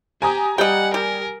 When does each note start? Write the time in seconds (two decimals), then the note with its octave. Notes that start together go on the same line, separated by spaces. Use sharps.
0.22 G4 G#5 A#5 D#6
0.58 G3 D#5 F#5 G5
0.94 G4 A#4